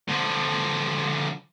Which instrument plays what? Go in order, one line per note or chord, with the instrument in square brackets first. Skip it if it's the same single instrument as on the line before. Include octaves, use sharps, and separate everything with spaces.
[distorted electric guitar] D3 F3